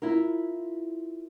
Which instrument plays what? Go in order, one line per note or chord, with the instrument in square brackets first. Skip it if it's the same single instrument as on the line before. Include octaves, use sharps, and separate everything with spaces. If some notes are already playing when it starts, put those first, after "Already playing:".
[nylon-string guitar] E4 F4 A#4